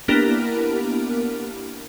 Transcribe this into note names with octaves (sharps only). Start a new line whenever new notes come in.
A#3 B3 D4 E4 G4 A#4